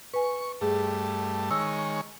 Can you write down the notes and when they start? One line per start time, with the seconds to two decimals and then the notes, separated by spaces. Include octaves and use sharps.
0.14 B4 G#5 C#6
0.61 G2 A3 G#4
1.51 D#3 G#3 C#5 E6